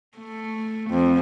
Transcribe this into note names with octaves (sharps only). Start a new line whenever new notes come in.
A3
F2